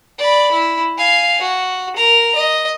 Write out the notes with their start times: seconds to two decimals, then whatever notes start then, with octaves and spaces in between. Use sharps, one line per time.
0.18 D5 B5
0.52 E4
0.97 F5 G#5
1.42 F#4
1.96 A#4 A#5
2.35 D#5